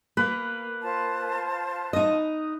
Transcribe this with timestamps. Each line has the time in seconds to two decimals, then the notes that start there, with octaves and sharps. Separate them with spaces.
0.17 A#3 B4
0.83 F4 C5 A5
1.93 D#4 D#5